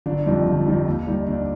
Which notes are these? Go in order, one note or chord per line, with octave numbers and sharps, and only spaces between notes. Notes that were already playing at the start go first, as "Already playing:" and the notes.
G1 D4
F2 D#3 G3
G1
F2 D#3 G3
D#2
D#3 G3
D#2 D4